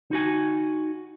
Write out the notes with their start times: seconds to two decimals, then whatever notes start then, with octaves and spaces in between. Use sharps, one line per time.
0.11 D#4 F#4 G#5